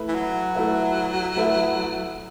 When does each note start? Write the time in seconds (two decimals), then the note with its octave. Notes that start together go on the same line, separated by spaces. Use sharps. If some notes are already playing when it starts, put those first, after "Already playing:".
Already playing: A3 E4 B4 E5
0.08 E3
0.15 F#3
0.55 A3 E4 B4 E5
1.36 A3 E4 B4 E5